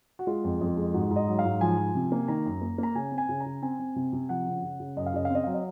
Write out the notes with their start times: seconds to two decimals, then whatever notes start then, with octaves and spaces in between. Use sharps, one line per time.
0.19 F#4
0.27 G#3 F4
0.44 F2
0.61 F2
0.77 G#3
0.94 G#2 F#4
1.11 G#2
1.16 D#5
1.28 F#3
1.39 F5
1.45 G#2
1.61 F3 G#5
1.78 F3
1.95 C3
2.12 A#3
2.28 D#3 A#5
2.46 F#2
2.62 A#3
2.78 A#3 A#5
2.95 C#3 G#5
3.12 C4
3.18 G#5
3.29 C#3
3.40 A#5
3.46 C#3
3.62 C4 G#5
3.79 C4
3.96 C3
4.13 C3
4.29 F3 F#5
4.46 C#3
4.63 C#3
4.80 C#3
4.97 F#2 D#5
5.06 F5
5.13 C#3 D#5
5.25 F5
5.30 C4 D#5
5.44 F#3 F5
5.54 D#5